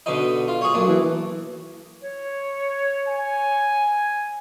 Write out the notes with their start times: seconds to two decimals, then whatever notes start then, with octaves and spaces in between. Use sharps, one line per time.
0.06 B2 D3 D#4
0.48 F4
0.61 G#4 C#5
0.74 B1 A#3 D4
0.88 E3
2.02 C#5
3.08 G#5